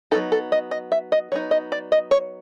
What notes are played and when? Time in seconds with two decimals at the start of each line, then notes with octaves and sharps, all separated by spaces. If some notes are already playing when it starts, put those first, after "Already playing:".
0.11 F#3 B3 D#4 A4
0.32 A4
0.52 D#5
0.71 D#5
0.92 E5
1.12 D#5
1.32 F#3 B3 D#4 C#5
1.51 D#5
1.72 D5
1.92 D#5
2.11 C#5